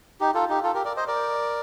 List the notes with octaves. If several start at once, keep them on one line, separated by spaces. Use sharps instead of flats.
D#4 G4
F4 A4
D#4 G4
F4 A4
G4 A#4
A#4 D5
C5 D#5
A#4 D5